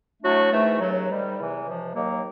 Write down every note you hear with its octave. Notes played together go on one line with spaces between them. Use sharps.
A2 F#3 A3 D4 F#4
G#2 E3 A3
D#2 C#3 F#3
G#2 D#3 G3
E2 C3 E3
C#2 C3 F3
D#2 D#3 F#3 A#3